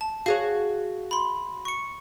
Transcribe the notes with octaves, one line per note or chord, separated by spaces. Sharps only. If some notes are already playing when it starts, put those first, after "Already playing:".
A5
F#4 G#4 C#5 F5
B5 C6
C#6 C#7